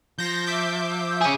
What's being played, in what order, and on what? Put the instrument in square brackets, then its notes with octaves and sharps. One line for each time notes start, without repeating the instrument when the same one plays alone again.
[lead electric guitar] F3 [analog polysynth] G6 A#6
[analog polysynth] E5 D6 G6
[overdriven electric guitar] C#4 G#4